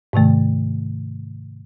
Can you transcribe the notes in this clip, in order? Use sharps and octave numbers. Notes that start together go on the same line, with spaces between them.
G#2 C3 D#3 A3